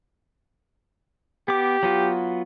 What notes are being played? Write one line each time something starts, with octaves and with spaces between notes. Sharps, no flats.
B3 G4 D6
F#3 B3 F4